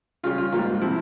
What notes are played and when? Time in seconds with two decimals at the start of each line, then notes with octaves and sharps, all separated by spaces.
0.23 C#3 G3 C#4 F4
0.38 F4
0.52 G#2 G3 A#3 F4
0.82 C3 F3 E4